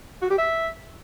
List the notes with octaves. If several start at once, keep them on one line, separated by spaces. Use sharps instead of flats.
F#4
G4
E5